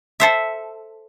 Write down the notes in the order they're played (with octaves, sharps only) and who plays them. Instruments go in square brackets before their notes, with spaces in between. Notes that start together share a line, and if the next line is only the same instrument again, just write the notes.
[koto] A4 C5 E5